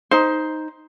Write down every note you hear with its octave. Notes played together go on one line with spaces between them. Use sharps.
D#4 C5